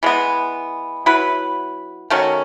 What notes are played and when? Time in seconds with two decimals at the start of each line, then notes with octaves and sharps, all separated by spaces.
0.03 E3 G#3 B3
1.06 F#3 B3 E4 B4
2.10 D#3 F#3 A3 C#4